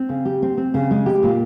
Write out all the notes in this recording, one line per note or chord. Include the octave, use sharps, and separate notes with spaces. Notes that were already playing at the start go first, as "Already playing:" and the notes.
Already playing: C4
C#3
G4
C4
C4
C#3
G#3
G4
A#2